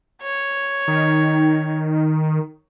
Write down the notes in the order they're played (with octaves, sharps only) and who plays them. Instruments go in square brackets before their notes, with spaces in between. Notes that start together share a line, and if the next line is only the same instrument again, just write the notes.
[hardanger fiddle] C#5
[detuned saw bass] D#3